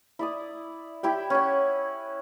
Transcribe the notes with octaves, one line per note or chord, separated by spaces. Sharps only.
E4 D5 D#6
E4 G4 G5
C#4 F#5